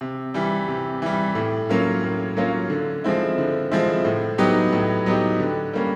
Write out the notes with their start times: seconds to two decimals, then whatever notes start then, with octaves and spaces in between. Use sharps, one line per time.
0.01 C3
0.34 E3 G3
0.68 C3
1.02 E3 G3
1.35 A2
1.69 F#3 A#3 C#4 F4
2.03 A2
2.37 F#3 A#3 C#4 F4
2.70 D3
3.04 F3 G#3 C4 E4
3.38 D3
3.72 F3 G#3 C4 E4
4.04 A2
4.38 F#3 B3 D#4 G4
4.73 A2
5.06 F#3 B3 D#4 G4
5.39 D3
5.73 G3 A#3 C#4